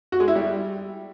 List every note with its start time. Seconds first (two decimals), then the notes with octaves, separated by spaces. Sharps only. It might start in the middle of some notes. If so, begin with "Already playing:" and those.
0.12 F#4
0.20 G#3
0.28 E4
0.35 G3